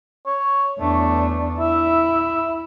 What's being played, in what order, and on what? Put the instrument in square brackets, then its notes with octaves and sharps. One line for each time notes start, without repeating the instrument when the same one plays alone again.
[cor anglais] C#5
[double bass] E2 D4 [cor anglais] A3
[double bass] E4 [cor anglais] E5